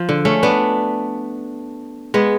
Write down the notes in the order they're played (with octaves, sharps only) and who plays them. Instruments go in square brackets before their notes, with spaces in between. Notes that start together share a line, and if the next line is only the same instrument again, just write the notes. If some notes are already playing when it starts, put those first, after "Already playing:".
Already playing: [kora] F3
D3
A3 C#4
B3 D4
G#3 B3